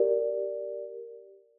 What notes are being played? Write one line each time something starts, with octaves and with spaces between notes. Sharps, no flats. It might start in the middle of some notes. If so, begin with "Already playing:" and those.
Already playing: G4 A#4 D5